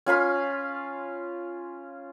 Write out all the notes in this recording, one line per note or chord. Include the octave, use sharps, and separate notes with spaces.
C#4 F4 F5 B5